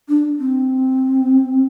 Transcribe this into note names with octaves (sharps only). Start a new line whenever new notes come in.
D4
C4